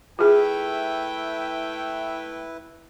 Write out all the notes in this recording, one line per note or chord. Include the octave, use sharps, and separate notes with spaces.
A3 E4 F4 G#4 B4 E5 G5